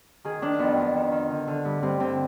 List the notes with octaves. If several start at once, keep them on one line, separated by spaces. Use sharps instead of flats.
D#3 G#4
D#3 D4
F2 B3
F2
D#3
D#3
D3
D3
G2
G2 C4
D3 C4